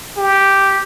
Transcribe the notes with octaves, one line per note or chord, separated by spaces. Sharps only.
G4